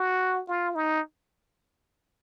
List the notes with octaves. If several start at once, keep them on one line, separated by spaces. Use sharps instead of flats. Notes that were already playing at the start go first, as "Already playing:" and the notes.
Already playing: F#4
F4
D#4